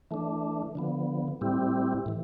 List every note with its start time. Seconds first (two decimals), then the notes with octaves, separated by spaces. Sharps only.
0.11 E3 A3 D4
0.75 D3 F3 B3
1.41 A2 G3 C4 E4 G4
2.06 A2 E3